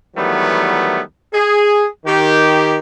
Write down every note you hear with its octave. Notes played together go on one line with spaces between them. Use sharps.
D#3 E3 F#3 G3 A3 B3
G#4
D#3 G4